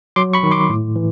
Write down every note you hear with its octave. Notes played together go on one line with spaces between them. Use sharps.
F#3 C6 D6
B5 C#6
D#3
C6 D6
A2
E3